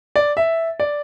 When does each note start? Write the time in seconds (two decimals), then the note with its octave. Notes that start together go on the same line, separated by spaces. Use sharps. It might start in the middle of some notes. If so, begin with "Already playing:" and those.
0.16 D5
0.37 E5
0.80 D5